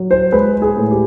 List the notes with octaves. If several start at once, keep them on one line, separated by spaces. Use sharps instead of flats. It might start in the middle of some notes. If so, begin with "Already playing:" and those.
Already playing: F#3
C5
G#3 B4
G#4
A2
G4